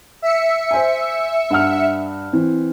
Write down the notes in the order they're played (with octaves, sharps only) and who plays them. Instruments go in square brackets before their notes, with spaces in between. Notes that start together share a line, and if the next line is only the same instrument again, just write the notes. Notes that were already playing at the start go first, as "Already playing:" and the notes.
[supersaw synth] E5 C#7
[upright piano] C5 G#5
G2 F#5 F6
E3 C4